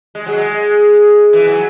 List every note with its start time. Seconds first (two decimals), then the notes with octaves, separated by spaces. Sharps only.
0.15 G#3
0.26 F#3
0.37 G#3
1.33 E3
1.48 F#3